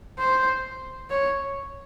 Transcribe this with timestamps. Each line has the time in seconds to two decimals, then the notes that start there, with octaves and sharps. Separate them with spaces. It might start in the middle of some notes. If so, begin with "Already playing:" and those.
0.19 C5
1.10 C#5